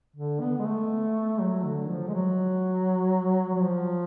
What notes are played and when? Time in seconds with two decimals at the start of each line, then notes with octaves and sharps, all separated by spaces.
0.16 D3
0.41 B3
0.58 G#3
0.65 A3
1.40 F#3
1.65 D3
1.89 F3
2.08 G#3
2.14 F#3
3.55 F#3
3.63 F3